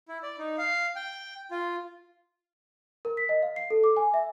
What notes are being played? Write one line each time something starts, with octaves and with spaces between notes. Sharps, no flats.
E4
D5
D#4
F5
G5
F4
A#4
B6
D#5
F5
C7
A4
D6
G#5
E5